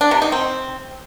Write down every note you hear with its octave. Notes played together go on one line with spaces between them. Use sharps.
D4
C3
D#4
C4